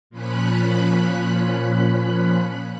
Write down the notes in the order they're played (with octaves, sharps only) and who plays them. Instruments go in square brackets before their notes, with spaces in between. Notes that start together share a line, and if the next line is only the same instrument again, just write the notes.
[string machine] A#2 F3 C#4 B5 F#6